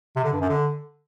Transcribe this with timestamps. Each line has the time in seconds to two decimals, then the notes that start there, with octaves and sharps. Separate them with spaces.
0.16 C3
0.24 D3
0.33 G2
0.41 F#2
0.49 D3